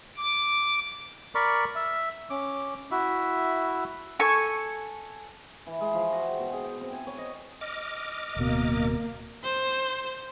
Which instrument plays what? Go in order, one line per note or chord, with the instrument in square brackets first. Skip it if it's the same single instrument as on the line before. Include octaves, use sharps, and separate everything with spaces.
[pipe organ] D6
[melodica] A#4 D5 B5 C#6
E5
C#4 D6
E4 F#4 E5
[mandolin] A4 G#5 C#6
[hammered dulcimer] E3
G#3
F3
F#4
G5
B2
G#4
G5
C4
G#5
C#5
D#5
[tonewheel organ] D#5 D6 F6
[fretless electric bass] D1 B2 [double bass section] A#3
[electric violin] C5